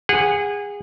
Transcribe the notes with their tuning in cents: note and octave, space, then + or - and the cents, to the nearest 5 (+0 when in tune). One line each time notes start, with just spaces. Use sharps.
G#4 -25 F#5 +0